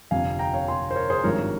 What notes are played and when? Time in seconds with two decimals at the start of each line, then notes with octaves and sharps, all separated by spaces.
0.11 G1 F2 C3 F5 G#5
0.39 G5 A#5
0.53 C#5 F5
0.68 G#5 C6
0.91 C5
0.96 A#4 C#5
1.10 G#4 C5
1.24 G#1 G2 F3 A#4 C#5